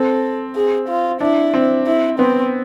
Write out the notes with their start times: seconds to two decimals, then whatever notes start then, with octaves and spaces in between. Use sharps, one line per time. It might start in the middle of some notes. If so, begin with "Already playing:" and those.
Already playing: C4 A4
0.55 G#4
0.88 F4
1.20 D4 E4
1.54 C4
1.87 E4
2.19 B3 C4